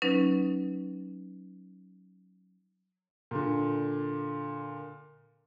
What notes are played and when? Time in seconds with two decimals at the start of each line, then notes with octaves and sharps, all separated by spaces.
0.02 F#3 C#4 D#4 B4
3.31 A#2 D3